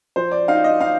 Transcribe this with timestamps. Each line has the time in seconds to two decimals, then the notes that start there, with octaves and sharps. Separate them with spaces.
0.16 F3 C5
0.32 D5
0.48 D#4 F5
0.64 D#5
0.80 D#4 F5